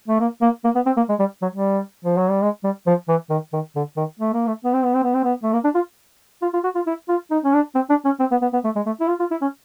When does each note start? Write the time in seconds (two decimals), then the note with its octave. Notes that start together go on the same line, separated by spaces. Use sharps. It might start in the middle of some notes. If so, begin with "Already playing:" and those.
0.08 A3
0.20 A#3
0.41 A#3
0.64 A#3
0.75 B3
0.86 C4
0.97 A#3
1.09 G#3
1.19 G3
1.42 F#3
1.52 G3
2.05 F3
2.17 F#3
2.30 G3
2.42 G#3
2.64 G3
2.87 F3
3.08 E3
3.30 D#3
3.53 D#3
3.75 D3
3.97 D#3
4.19 A3
4.33 A#3
4.47 A3
4.64 B3
4.73 C4
4.85 B3
4.94 C4
5.03 B3
5.14 C4
5.24 B3
5.43 A3
5.53 A#3
5.64 D4
5.75 F4
6.42 F4
6.53 F4
6.64 F#4
6.75 F4
6.86 E4
7.08 F4
7.31 D#4
7.44 C#4
7.53 D4
7.75 C4
7.89 D4
8.05 C#4
8.20 C4
8.31 B3
8.42 B3
8.53 B3
8.64 A3
8.76 G#3
8.86 A3
9.00 E4
9.08 F4
9.19 F4
9.31 E4
9.41 C#4